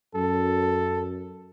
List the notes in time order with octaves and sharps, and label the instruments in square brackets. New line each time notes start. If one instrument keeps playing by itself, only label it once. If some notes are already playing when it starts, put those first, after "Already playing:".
[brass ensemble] F#2 [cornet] A4